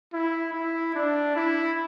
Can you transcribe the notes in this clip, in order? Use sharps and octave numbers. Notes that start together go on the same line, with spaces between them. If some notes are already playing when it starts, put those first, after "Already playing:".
E4
E4
D4
E4